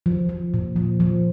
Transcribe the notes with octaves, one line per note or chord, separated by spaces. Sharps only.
F3
F3
A#2
F3
F3